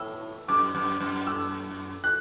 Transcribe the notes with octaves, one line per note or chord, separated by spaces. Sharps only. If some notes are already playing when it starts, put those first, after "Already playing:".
Already playing: A2 E6
F#2 D6
F#2
F#2
E6
F#6